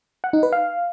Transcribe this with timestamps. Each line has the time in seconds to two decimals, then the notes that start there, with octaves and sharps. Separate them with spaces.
0.24 F#5
0.33 D#4
0.43 B4
0.53 F5